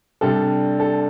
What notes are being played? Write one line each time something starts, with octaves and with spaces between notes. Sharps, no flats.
C3 G3 D4 A4
A4